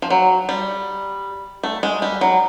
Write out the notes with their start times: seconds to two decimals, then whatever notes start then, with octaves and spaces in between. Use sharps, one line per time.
0.02 F3
0.10 F#3
0.49 G3
1.63 A3
1.83 G#3
2.02 G3
2.21 F#3